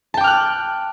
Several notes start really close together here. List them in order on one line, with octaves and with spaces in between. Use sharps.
A5 G5 D6 F6 F#6